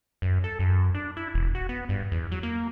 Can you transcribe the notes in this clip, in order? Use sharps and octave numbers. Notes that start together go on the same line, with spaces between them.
F#2
A4
F#2
D4
E4
E1
F#4
B3
G2
E2
F#3
A#3